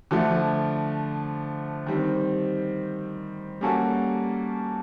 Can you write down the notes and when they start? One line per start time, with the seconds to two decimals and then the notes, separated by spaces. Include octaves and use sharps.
0.11 D3 F3 A3
1.87 D#3 G3 C4
3.61 G3 A#3 C#4 F#4 A4